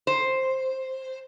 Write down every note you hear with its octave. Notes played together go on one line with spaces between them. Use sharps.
C5